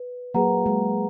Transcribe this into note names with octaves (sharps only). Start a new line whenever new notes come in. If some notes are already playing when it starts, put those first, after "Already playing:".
Already playing: B4
F#3 A#3 G#4 B4 F#5 A#5
G#3